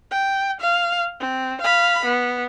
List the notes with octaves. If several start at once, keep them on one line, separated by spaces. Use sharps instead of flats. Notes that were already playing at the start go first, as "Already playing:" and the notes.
G5
F5
C4
F5 B5
B3